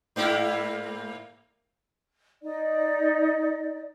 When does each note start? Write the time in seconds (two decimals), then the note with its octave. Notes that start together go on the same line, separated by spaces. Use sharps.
0.16 G#2 A#3 E4
2.42 D#4 D5